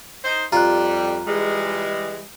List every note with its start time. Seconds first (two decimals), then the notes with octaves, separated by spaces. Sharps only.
0.24 D#4 C5
0.52 F2 G3 F4 A#5 F#6
1.27 E3 G3 G#3